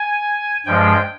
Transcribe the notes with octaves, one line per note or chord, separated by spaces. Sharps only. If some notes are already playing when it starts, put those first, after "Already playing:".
Already playing: G#5
G2 F3 G#3 G5